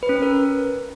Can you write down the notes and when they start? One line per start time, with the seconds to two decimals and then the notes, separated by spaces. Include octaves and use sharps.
0.03 B4
0.09 C#4
0.16 B4
0.22 A#4